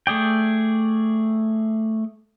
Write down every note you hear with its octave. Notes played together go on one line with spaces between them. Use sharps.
A3 G#4 D5 G5